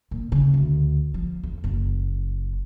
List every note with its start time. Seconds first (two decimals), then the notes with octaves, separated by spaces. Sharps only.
0.11 A#2
0.32 C#3
0.54 D2
1.14 F3
1.43 F2
1.64 F#1